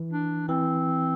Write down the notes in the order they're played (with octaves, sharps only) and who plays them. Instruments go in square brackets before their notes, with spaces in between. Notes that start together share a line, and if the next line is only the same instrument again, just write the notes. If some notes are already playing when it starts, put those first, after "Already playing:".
Already playing: [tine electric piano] E3
[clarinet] D4
[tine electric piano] E3 [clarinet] C4